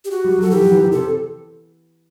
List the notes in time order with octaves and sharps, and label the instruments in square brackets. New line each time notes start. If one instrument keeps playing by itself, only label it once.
[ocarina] G4
F#4
[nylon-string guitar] G3
[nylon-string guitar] F#3 [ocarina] A4
[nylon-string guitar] E3 [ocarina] G4
[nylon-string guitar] F#3
E3
D#3
[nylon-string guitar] C3 [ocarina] A4